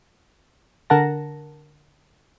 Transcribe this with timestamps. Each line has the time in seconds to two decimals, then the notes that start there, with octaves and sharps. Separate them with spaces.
0.90 D3 A#4 F#5 A5 A#6